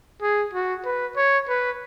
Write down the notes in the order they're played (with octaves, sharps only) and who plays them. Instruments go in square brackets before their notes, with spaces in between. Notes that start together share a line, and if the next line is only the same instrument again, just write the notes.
[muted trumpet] G#4
F#4
B4
C#5
B4